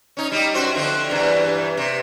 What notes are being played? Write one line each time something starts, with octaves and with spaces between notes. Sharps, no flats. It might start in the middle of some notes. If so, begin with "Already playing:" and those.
C#4 D#4
G3 D#4 G4
F#2 F#4 C5
D3 F3 C4
E2 G2 E3
C3